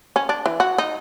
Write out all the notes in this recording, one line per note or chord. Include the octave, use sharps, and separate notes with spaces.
C#4
D4
E3
F#4
D#4